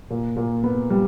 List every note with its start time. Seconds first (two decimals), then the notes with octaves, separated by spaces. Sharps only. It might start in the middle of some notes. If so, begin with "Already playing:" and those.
0.10 A#2
0.36 A#2
0.63 B3
0.90 G3